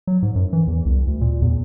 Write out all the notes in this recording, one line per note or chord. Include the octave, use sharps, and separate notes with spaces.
F#3
G#2
F#2
E3
E2
C2
D2
A#2
E2